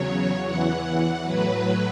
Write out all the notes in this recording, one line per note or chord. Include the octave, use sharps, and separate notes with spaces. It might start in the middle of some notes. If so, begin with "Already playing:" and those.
Already playing: E2 C#3 F#3 C#5
E2 E3 F#5
F#5
A2 F#3 B4